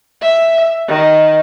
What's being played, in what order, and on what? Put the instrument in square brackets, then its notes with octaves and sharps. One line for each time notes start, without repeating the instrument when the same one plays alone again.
[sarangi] E5
D#3